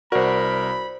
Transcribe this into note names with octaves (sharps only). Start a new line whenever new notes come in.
C2 F#4 A#4 C5 D5 B5